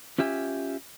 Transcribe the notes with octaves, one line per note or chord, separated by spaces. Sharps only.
C#4 F4 G4 E5 G#5